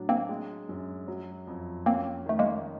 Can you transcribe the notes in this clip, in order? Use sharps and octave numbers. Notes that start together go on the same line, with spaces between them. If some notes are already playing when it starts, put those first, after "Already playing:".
Already playing: A2 F#3 D4
A#3 C4
G#3
F#2
F#3
F2
A#3 C4 C#4
D#3 A3
G#3 A#3